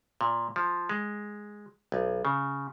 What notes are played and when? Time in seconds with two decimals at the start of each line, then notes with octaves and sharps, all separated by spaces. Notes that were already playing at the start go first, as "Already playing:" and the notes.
0.21 A#2
0.56 F3
0.89 G#3
1.92 B1
2.25 C#3